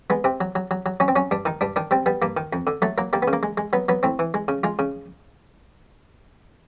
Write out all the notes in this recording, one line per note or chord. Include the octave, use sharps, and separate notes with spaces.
G#3 B3
C3 C4
F#3
F#3
F#3
F#3
F#3 C#4
C4
F#3 C#4
G2 D4
D#3 D#4
G2 D4
D#3 D4
G3 C4
G3 B3
G2 A#3
D#3
F2
D3
F#3 A3
F#3 A#3
G3 A#3
B3
C#3
A#3
G#3
G#3
F#3 B3
F#3 B3
A2 C4
E3
G#3
C#3
G#3 F4
C#3